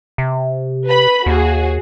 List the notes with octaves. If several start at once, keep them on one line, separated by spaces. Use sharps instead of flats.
C3
B4 B5
D#2 F#4 G#4